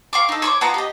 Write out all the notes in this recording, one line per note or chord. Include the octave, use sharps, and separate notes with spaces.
F5 C#6 D6
D#4 A4
C#5 C6 D6
B3 F4 A5 A#5
G4 D#5